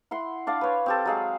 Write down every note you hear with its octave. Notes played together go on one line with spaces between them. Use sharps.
E4 F#5 C6
D4 D5 F5
B4 C#5
C4 G4 A4
F#3 G#3 F5